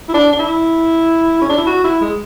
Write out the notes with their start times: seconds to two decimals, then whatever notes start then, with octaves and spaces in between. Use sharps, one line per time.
0.09 E4
0.14 D4
0.32 D4
0.39 E4
1.41 C#4
1.49 D4
1.58 E4
1.67 F#4
1.84 E4
2.01 G#3